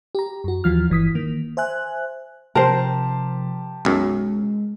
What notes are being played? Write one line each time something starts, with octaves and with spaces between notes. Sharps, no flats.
G4 A#5
F#2 F#4
D#2 E3 F3 F4 F6
G1 E3 D#6 B6
D#3 A#3
C5 E5 G#5 F#6
C3 F3 G4 A#4 C5 A5
B1 F#2 G#3